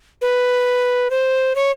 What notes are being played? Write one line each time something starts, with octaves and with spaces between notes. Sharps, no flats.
B4
C5
C#5